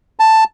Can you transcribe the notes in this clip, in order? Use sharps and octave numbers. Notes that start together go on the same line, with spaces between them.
A5